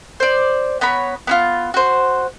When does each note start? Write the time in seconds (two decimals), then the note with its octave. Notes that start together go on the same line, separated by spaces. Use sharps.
0.20 C5 D5
0.81 B3 C#5 A#5 B5
1.27 B3 D#4 F4
1.74 F#4 C5